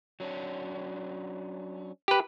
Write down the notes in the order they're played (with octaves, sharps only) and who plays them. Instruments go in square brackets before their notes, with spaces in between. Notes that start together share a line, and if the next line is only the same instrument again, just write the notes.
[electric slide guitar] F#3 C#4 D4
[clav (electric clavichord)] G4 B4